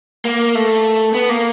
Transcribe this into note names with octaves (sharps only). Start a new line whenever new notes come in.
A#3
A3
B3
A#3